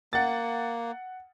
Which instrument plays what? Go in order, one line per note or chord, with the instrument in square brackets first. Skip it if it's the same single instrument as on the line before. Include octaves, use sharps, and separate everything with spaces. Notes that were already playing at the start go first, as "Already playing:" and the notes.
[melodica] A#3 [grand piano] F#5 A6